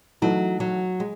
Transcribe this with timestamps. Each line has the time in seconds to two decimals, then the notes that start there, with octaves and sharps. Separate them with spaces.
0.22 E3 F#3 A3 D#4
0.60 F#3
1.00 G#3